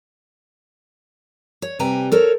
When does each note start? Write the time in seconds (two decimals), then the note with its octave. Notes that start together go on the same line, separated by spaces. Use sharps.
1.62 C#5
1.79 C3 G3 B4 G5 G#5 A#5
2.12 A4 A#4 C5 C#5